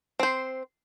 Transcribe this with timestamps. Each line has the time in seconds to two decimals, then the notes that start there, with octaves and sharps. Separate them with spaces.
0.20 C4 C5